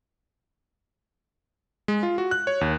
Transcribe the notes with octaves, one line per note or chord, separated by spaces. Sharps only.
G#3
F4
F#4
F#6
C#5
D#2